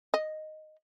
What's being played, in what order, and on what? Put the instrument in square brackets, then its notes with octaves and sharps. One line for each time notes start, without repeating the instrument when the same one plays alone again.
[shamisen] D#5